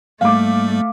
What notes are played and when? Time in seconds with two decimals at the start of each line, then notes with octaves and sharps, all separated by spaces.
0.21 G#2 G3 A3 A#3 F5 D6